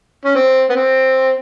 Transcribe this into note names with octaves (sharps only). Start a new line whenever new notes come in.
C#4
C4
B3
C4